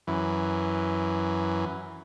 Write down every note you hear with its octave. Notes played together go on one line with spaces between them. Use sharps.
F#2 E3